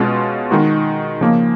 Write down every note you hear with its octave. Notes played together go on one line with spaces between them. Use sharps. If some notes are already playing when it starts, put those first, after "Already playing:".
Already playing: B2 G#3 C#4 F4
D#3 G#3 D#4 F#4
C#3 F3 A#3